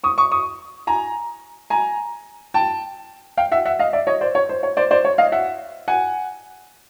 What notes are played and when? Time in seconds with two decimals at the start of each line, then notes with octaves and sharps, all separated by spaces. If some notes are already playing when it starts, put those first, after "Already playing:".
0.04 C#6 D#6
0.18 C#6 D#6
0.31 C#6 D#6
0.87 G#5 A#5
1.70 G#5 A#5
2.54 G5 A5
3.37 F5 G5
3.52 E5 F#5
3.65 E5 F#5
3.79 D#5 F5
3.93 D5 E5
4.07 C#5 D#5
4.21 C5 D5
4.35 C#5
4.49 C5
4.63 C#5
4.77 C5 D5
4.91 C5 D5
5.05 C#5
5.18 D#5 F5
5.32 E5 F#5
5.88 F#5 G#5